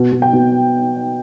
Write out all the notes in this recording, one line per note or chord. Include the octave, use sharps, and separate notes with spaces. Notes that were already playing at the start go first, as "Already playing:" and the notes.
Already playing: B2
B2
G5
B2